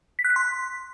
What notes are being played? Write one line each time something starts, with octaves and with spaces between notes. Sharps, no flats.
B6
F#6
B6
C6